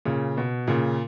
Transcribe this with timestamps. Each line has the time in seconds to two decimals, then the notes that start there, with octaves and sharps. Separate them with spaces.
0.05 A#2 C#3
0.37 B2
0.67 A#2 C#3